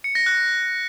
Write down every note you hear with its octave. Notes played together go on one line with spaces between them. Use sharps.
C#7
A#6
F#6